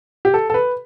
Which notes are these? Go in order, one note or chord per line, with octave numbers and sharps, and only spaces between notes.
G4
A4
A4
B4